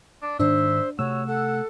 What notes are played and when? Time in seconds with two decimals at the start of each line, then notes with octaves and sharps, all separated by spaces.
0.22 D4
0.39 G#2 D#3 D4 C5 E5
0.99 C3 A3 F#4 C#5 E6
1.27 A4 F#5